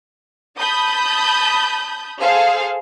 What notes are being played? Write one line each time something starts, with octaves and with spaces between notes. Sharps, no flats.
A5 B5 D#6 G6
G#4 A4 C5 F5